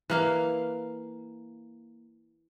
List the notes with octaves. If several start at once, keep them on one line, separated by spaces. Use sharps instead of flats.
E3 A#3 F5